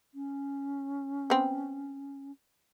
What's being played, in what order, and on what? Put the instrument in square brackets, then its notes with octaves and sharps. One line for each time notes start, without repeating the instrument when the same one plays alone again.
[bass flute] C#4
[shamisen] B3 C4